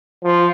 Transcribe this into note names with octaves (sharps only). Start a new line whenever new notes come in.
F3